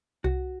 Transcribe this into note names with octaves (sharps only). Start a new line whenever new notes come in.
C2 F#4